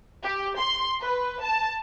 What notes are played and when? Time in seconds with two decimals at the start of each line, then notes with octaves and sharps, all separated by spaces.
0.24 G4
0.59 C6
1.03 B4
1.41 A5